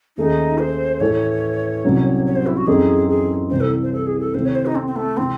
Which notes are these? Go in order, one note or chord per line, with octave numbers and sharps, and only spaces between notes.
D#2 D#3 A3 C#4 D#4 G#4
C5
A2 E3 A3 C#5
C2 C3 F#3 C#4
C#5
C5
E4
F#4
F#2 E3 C4 D#4 G#4 A4
G#4
C2 C3 E3 C5
A4
C5
A4
G#4
A4
C3 D#3 A3 C4 E4 C5
C#5
C5
D#4
C4
C4
A3
C3 E3 G#3 C4